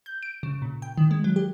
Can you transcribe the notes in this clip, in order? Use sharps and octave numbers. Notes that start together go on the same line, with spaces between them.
G6
D7
C#3
A#2
G5
D#3
G#3
F#3
G4